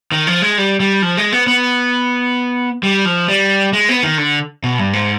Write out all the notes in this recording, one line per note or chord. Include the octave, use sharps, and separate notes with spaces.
D#3
F3
G#3
G3
G3
F3
G#3
B3
B3
G3
F3
G3
G#3
B3
D#3
D3
B2
G2
G#2